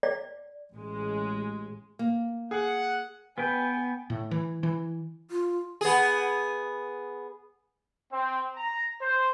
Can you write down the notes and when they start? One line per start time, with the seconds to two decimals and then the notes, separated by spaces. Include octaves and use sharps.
0.03 D5
0.73 A1 G#3
1.99 A#3
2.51 G#4 F#5
3.38 B3 B4 G5 G#5
4.10 A2
4.31 E3
4.63 E3
5.31 F4
5.81 B3 G#4
8.12 C4
8.55 A#5
9.02 C5